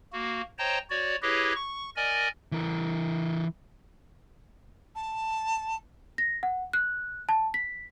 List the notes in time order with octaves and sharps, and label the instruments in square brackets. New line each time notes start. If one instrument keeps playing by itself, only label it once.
[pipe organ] A#3 F#4
C5 C#5 D#5 G5 A5 A#5
F#4 C#5 D5
E4 G4 G#4 B4 C#5 D#5
C#6
A#4 D5 D#5 G#5
[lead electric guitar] E3 A#4
[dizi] A5
[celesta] A#6
F#5
F#6
A5
B6